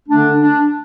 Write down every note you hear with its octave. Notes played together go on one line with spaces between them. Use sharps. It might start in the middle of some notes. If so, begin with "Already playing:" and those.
D3 A3 D4
D4